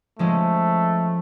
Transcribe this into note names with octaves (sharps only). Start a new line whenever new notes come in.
F3 G#3 A3 C#4